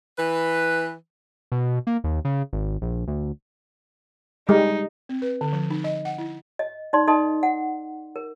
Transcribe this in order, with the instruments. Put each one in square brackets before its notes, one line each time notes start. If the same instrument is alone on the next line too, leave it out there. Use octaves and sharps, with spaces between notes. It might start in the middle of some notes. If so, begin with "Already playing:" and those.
[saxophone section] E3 B4
[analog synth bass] B2
A#3
D#2
C#3
G#1
A#1
D2
[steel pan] G3 G#3 [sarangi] D#4
[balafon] C4
B4
D3
F3
D#4
D#5
F#5
E4
[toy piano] D#5
D#4 D5 C6
D#4 A4 D#5 C6
F#5
A#4